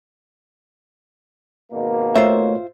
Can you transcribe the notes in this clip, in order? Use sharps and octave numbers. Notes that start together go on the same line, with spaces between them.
G#1 B2 A#3
A3 F4 C5 C#5 E5